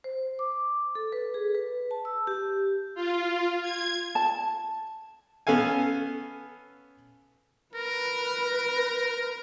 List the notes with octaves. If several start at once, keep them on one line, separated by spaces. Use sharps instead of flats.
C5
D6
A4
B4
G#4
B4
A5
E6
G4
F4
G#6
A5
B3 C#4 A4 F5 G#5
A#4 B4